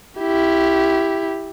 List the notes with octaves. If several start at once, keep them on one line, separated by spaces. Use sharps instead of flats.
E4 G4